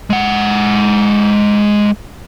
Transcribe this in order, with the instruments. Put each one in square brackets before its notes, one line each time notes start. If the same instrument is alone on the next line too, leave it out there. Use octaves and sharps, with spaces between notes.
[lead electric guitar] G#3 F#5